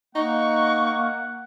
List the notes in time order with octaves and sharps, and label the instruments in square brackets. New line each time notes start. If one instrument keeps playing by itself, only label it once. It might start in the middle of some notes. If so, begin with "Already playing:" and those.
[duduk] A#3 [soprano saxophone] D#4 [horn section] F#5 [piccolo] C#6